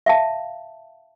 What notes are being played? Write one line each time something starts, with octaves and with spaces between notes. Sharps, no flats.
E5 F5 A5